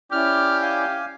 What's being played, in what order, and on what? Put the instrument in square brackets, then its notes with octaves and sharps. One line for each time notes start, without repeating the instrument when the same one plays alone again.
[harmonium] C#4 E4 D5 [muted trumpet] G4 [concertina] F6
[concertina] F5 G#5